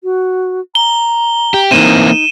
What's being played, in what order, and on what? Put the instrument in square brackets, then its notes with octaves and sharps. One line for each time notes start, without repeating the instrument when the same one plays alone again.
[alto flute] F#4
[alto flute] A#5 [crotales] G7
[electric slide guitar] G4
[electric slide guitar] E3 A#3 C4 [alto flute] D#4 [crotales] D#7 E7